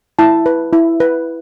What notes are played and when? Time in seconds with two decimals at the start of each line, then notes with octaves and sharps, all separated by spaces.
0.19 E4 A5
0.46 B4
0.73 E4
1.00 B4